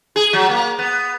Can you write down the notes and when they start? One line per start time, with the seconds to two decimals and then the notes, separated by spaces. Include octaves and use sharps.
0.16 G#4
0.33 F#3
0.49 A#3
0.79 B3